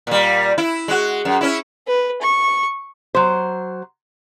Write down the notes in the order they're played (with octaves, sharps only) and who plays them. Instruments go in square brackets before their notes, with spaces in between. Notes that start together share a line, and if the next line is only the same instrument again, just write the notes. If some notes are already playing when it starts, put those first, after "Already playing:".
[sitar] A#2 G3
E4
G#3 F#4
F#2
C#4 E4
[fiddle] B4
C#6
[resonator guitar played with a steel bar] F#3 C5